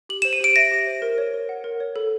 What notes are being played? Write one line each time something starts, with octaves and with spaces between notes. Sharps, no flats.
G4 F#7
C5 E7
D#7
G4 D7
E5 A#6
G4
C5
A#4
C#5
A#4
F#5
A#4
C#5
A4